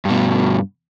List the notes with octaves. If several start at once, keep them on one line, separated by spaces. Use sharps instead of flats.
G2 B2